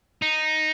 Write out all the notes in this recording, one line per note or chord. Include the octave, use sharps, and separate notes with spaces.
D#4